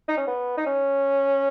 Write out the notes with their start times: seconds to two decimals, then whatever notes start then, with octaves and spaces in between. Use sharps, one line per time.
0.08 D#4
0.18 C#4
0.28 B3
0.58 D#4
0.66 C#4